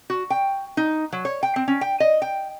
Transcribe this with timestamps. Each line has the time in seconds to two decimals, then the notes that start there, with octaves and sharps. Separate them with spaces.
0.10 F#4
0.30 G5
0.77 D#4
1.13 F#3
1.25 C#5
1.43 G5
1.56 C4
1.68 C#4
1.81 G5
2.00 D#5
2.22 G5